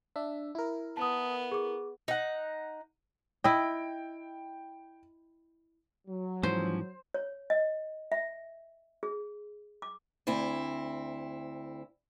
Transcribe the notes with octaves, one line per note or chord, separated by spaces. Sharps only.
D4 E5
E4 A#4
B3 A5 D#6
G#4 D6
D#4 F#5
E4 D#5 G5
F#3
G#2 E3 F3 C#4 C5
C#5
D#5
E5
G#4
D6
D2 C4 E4